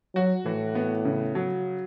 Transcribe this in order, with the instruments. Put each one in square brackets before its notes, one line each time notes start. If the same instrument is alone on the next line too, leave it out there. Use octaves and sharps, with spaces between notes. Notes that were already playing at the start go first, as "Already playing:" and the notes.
[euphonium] F#3 [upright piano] F#4
[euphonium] A2 [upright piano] E3
[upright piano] B3
C#3
F#3